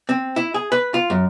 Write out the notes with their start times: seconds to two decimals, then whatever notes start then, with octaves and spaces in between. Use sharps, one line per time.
0.09 C4
0.36 E4
0.54 G#4
0.72 B4
0.94 F4
1.10 F#2